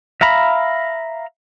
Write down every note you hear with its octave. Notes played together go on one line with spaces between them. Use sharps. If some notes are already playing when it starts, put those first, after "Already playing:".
E5 F5 A#5 B5